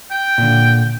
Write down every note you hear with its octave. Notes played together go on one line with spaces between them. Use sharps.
G5
A#2 D3